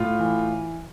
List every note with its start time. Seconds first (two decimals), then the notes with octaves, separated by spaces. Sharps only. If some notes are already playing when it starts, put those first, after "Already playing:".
Already playing: A2 F4 F5
0.19 E3